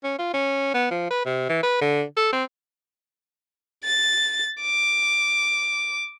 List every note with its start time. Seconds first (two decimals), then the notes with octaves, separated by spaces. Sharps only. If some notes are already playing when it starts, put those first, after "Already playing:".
0.04 C#4
0.19 F4
0.34 C#4
0.75 B3
0.91 F3
1.11 B4
1.26 C3
1.49 E3
1.63 B4
1.81 D3
2.17 A4
2.33 C4
3.84 A6
4.62 D6